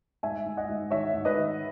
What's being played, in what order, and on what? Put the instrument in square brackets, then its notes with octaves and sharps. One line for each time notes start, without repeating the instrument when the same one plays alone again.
[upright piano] G#2 E5 G#5
G#2
D#5 F#5
G#2
D#3 C#5 E5
G#2
B4 D#5
D#3